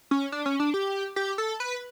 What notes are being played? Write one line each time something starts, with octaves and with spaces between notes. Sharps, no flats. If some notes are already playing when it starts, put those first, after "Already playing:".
C#4
D4
C#4
D4
G4
G4
A4
B4